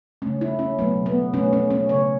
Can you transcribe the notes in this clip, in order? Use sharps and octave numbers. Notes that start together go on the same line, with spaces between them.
C#3 A3 C#4
E4
C#4
B2 F#3 A3 B3
B3
B2 A3 C#4
C#4
C#4
C#3 A3 C#5